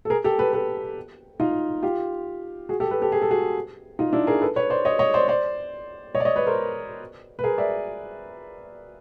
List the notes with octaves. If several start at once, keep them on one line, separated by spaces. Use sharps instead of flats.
A4
G#4 A#4
G4 A4
A4 B4
A4 B4
D#4 F4
F4 G4
F#4 G#4
G4 A4
A4 B4
G4 A4
G#4
A4
F#4 G#4
D#4 F4
D4 E4
G#4 A#4
A4 B4
B4 C#5
C5 D5
C#5 D#5
C#5 D#5
C5 D5
C5 D5
C#5 D#5
D5
C#5 D#5
B4 C#5
A#4 C5
B4
G#4 A#4
D5 E5